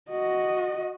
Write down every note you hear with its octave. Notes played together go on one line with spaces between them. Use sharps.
F#4 D#5